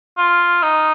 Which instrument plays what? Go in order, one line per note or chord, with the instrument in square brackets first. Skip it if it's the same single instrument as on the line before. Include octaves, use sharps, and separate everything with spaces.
[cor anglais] F4
D#4